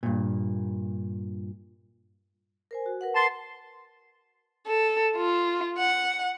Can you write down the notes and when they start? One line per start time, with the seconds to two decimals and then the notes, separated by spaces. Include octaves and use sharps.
0.03 G2 A#2
2.71 A#4 C5 G#5
2.86 F#4
3.01 A#4 B4 F#5
3.15 A5 C6
4.67 A4
5.17 F4
5.78 F#5